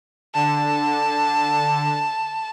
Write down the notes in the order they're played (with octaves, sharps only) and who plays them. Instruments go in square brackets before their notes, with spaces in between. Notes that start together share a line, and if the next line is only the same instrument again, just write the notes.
[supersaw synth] D3 [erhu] A5